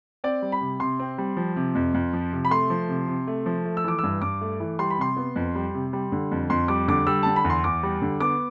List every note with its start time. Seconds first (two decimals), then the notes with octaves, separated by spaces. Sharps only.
0.24 C4 D5
0.42 G3
0.52 B5
0.61 C3
0.80 C3 C6
0.99 C4
1.18 G3
1.37 F3
1.56 C3
1.75 F2
1.94 F2
2.13 F3
2.33 C3
2.45 B5
2.51 A3 C6
2.70 F3
2.89 C3
3.08 C3
3.27 A3
3.46 F3
3.65 A3
3.77 E6
3.84 E3 D6
3.99 G2 E6
4.22 G2 D6
4.41 A3
4.60 E3
4.79 G3 C6
4.91 B5
4.98 C3 C6
5.17 B3
5.36 F2
5.55 G3
5.74 C3
5.93 G3
6.12 D3
6.31 F2
6.50 F2 C6
6.68 G3 D6
6.88 D3 D6
7.07 G3 E6
7.23 D3 A5
7.36 B5
7.44 E2
7.50 C6
7.64 E2 D6
7.83 G3
8.02 D3
8.20 B3 D6